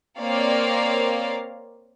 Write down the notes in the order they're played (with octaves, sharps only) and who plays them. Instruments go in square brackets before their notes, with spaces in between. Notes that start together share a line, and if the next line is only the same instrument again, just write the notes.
[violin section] A#3 C4 A#4 C#5 D5 F5